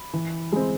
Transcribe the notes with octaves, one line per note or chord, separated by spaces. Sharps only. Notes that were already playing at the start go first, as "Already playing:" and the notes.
Already playing: B5
E3
G#3 C4